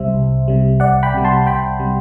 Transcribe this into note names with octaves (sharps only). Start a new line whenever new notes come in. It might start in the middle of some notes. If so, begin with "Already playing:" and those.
Already playing: C2 C3 G3 C5 E5
C2
C3 G3
C2 D5 F#5
G5 B5
C3 G3
A5 C6
C2 G5 B5
C3 G3